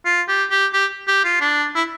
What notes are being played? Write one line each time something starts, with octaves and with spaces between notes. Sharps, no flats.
F4
G4
G4
G4
G4
F4
D4
E4